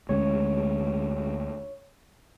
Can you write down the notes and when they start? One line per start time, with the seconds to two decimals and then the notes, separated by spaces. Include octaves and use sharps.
0.09 D2 G#3 C#4 C#5